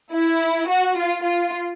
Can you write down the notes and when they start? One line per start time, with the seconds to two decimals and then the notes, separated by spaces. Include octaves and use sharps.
0.12 E4
0.69 F#4
0.97 F4
1.24 F4